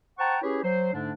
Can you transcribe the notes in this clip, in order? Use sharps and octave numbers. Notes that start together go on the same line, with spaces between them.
C5 F#5 G5 A5 A#5 C#6
C#4 E4 G4 G#4 B4 C#5
F#3 C5
G#2 D3 A3 D4